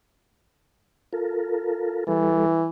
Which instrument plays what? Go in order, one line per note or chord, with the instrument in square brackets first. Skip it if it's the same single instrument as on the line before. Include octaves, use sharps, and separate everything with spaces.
[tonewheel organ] F4 A4 A#4
[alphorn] E3 [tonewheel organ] G3 A4